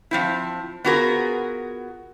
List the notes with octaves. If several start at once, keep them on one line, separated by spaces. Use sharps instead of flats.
F3 C4 E4
B3 F4 F#4 G#4 A#4